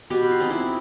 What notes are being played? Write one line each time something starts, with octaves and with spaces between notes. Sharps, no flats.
B2 G4
F4
G#3 C4 D#4
E4